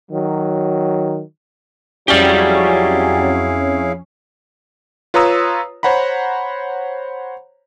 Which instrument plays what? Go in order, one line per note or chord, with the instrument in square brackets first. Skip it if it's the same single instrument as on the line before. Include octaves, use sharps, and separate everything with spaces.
[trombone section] D#3 F#3
[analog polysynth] F2 C#4 [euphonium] F#3 [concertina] E4 G#4 F5 [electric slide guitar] G4 D5
[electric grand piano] F4 B4 C#5 A#5 D#6 E6
C5 C#5 F#5 A#5 B5